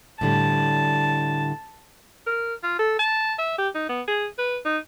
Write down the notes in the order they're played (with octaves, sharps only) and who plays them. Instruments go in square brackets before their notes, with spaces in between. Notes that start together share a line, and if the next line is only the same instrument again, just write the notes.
[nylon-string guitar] A2 D3 G3 [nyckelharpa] A5
[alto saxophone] A#4
F4
A4
A5
E5
G4
D#4
B3
G#4
B4
D#4